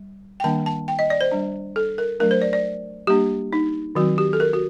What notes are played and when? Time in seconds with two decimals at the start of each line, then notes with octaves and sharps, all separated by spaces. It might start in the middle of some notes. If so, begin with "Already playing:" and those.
Already playing: G3
0.40 G5
0.44 D#3 G3 A#3 D4 A5
0.66 A5
0.88 G5
0.99 D#5
1.10 D5
1.21 C5
1.32 G3 D4
1.76 A4
1.98 A#4
2.20 F#3 A3 D4 A#4
2.31 C5
2.42 D5
2.53 D5
3.07 G3 A#3 D4 G4
3.53 D#4
3.95 D#3 F#3 C4 F#4
4.18 G4
4.33 A4
4.40 A#4
4.53 F#4